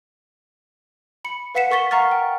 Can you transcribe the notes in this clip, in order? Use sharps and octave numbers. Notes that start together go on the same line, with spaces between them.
B5 C#7
B4 F5 F#5 B6 C#7 E7
A#4 C#6 A6 B6 G7
F5 F#5 A#5 C#6 F6 A6
G5